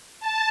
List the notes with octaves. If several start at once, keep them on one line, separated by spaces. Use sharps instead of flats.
A5